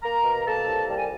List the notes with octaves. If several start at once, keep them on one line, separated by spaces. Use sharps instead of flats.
A#3 A#4 A#5
B2
A#3 A4 A5
C2
G3 A5
G#5